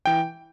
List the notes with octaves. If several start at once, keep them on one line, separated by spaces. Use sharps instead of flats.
E3 G5